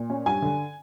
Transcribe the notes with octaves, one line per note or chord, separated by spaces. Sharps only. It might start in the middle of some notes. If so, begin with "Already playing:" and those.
Already playing: A#2
C#4
G2 G#5
D3